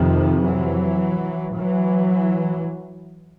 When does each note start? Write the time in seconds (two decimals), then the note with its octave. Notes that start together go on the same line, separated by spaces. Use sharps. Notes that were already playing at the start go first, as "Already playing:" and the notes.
Already playing: F2 C3 D#3 F3
0.41 E3 F#3
1.56 E3 F#3